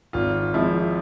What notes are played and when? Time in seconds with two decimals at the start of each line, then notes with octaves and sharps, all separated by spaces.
0.13 G#1 F4
0.54 G#2 F3 E4